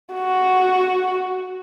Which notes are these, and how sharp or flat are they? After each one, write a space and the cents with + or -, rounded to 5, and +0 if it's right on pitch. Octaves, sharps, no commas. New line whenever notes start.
F#4 +0